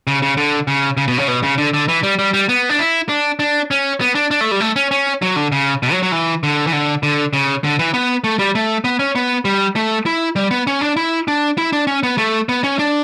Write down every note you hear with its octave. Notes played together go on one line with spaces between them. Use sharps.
C#3
C#3
D3
C#3
C#3
B2
C#3
B2
C#3
D3
D3
E3
G3
G3
G3
B3
D4
E4
D4
D4
C#4
B3
D4
D4
A3
G3
A3
C#4
C#4
F#3
D3
C#3
B2
F#3
F#3
E3
D3
E3
D3
D3
C#3
D3
E3
B3
A3
G3
A3
B3
C#4
B3
G3
A3
E4
G3
B3
C#4
D4
E4
D4
E4
D4
C#4
B3
A3
B3
C#4
D4